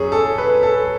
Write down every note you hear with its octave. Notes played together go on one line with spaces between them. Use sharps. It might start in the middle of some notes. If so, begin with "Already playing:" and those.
Already playing: F#2 G#4 C#5
A4
B4
A4